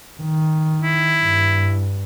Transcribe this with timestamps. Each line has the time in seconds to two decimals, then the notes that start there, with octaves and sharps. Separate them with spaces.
0.21 D#3
0.82 E4
1.21 G2